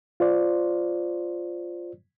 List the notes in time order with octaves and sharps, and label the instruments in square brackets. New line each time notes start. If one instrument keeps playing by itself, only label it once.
[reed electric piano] F4 C5 D5